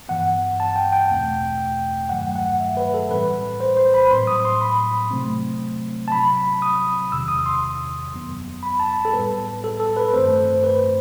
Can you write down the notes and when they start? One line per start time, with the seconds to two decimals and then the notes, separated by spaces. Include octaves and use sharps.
0.09 G2 E3 B3 F#5
0.60 A5
0.76 G5
0.93 G5
1.10 E2 B2 A3 C4
2.09 G2 D#3 F#3 A3 F#5
2.36 F#5
2.60 E5
2.77 B4
2.94 A4
3.10 A2 E3 G3 C4 B4
3.60 C5
3.77 C5
3.94 B5
4.11 A2 F#3 C4 C6
4.27 D#6
4.45 C6
4.61 B5
5.11 C3 F#3 A3 C4
6.08 A5
6.11 C3 F#3 C4 B5
6.62 D#6
7.12 E2 C3 D#3 E6
7.28 D#6
7.46 C6
8.13 F#2 F#3 B3
8.63 B5
8.80 A5
8.97 A5
9.05 A4
9.13 A2 G3 B3 B4
9.64 A4
9.80 A4
9.97 B4
10.13 G2 D#3 A3 C4 C5
10.64 B4